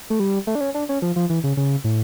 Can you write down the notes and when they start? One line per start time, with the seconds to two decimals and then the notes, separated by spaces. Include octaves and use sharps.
0.10 A3
0.20 G3
0.47 A3
0.55 D4
0.61 C#4
0.74 D4
0.89 C#4
1.02 F3
1.16 F3
1.30 E3
1.44 C#3
1.57 C#3
1.84 A2